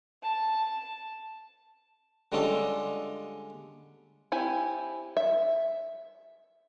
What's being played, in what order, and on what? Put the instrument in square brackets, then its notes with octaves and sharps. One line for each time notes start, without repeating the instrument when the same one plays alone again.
[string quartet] A5
[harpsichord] D3 G3 G#3 C#4 F4 A4
[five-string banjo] C4 E4 G4 G#5
E5